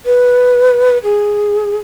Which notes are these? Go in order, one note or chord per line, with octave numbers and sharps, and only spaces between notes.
B4
G#4